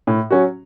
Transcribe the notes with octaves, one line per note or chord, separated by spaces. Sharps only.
A2
F#3 C#4 F#4